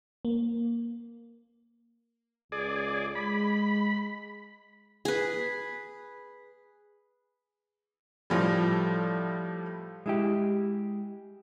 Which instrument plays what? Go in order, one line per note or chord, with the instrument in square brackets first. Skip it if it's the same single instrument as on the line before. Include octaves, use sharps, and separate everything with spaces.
[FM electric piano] A#3
[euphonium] C#2 [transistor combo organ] G#4 D5
[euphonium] G#3 [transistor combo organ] B5
[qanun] G#4 B4
[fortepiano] A2 F3 G3
[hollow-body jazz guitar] G#3 E4 G4